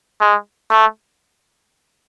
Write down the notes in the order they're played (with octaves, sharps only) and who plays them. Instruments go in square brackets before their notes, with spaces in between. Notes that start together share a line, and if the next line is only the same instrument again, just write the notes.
[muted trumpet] G#3
A3